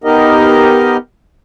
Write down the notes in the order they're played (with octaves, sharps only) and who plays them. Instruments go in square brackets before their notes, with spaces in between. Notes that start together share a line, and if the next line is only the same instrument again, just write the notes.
[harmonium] B3 D#4 G4 A#4 D#5